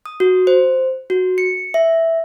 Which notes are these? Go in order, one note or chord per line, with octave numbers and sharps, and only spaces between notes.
D#6
F#4
C5
F#4
C#7
E5